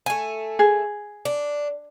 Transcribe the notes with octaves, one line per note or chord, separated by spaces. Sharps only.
A3 G#5
G#4
D4